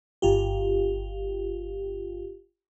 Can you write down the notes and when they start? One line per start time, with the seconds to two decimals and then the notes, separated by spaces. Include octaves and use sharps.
0.22 G1 F4 G4